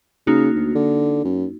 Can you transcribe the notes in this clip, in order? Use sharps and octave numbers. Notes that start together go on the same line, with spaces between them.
C#3 A#3 D#4 F#4
D2
D3
F#2